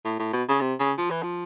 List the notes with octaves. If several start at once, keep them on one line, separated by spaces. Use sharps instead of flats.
A2
A2
B2
C#3
C3
C#3
F3
E3
F3